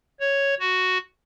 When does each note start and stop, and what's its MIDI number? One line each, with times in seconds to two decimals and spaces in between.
0.20 0.55 73
0.60 0.98 66